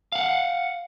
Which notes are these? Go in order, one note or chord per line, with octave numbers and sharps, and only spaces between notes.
F5 F#5